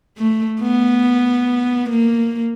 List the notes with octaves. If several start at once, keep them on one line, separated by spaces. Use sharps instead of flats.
A3
B3
A#3